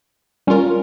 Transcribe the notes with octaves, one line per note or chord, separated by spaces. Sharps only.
G3 C#4 F4 A#4